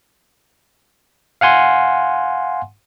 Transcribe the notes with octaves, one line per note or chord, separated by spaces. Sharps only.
F5 F#5 G#5 C6